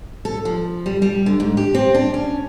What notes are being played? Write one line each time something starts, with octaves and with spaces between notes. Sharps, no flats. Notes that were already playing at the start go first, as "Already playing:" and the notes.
A4
F3
G3
G3
D3
G#2
G4
C4
D4
C#4